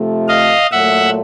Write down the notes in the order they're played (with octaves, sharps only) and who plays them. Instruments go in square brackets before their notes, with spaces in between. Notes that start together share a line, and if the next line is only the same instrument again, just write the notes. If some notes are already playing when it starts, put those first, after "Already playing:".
Already playing: [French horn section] C3 F3 A3
[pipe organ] D#5 F5
[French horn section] A#2 F#3 A3 [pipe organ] E5 F#5